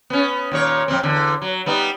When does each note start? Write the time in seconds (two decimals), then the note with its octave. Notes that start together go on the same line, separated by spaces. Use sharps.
0.10 B3 C#4
0.52 D#2 A#2 C#5
0.88 F2 A#2 C4
1.03 E2 D3
1.42 F#3
1.66 G3 B3 D#4